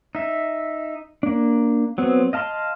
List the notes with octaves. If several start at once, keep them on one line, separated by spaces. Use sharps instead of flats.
D#4 E5
A#3 D4
F#3 B3 C4
D#5 F5 A5 A#5 C6